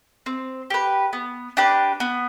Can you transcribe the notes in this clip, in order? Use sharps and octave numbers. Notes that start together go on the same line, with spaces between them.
C4
G4 B4
B3
D4 G4 B4
B3